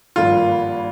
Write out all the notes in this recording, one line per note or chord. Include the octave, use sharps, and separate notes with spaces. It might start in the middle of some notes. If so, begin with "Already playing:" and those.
G#1 G2 F3 A#3 F4